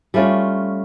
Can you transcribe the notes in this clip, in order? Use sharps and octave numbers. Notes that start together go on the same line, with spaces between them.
G3 A3 C#4 F4